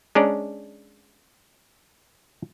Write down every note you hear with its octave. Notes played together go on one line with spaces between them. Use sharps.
G#3 C#4 D4 D5 A#5